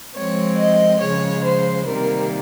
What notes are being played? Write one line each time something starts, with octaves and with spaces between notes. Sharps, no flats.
F3 G#3 C4 C#5
D#5
C#3 F3 G#3 C#5
C5
C3 D#3 G3 A#3 A#4